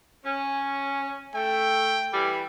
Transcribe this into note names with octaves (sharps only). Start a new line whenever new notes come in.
C#4
A3 G5
E3 G3